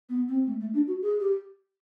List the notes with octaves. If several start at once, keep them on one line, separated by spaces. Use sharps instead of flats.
B3
C4
A3
A3
D4
F#4
G#4
G4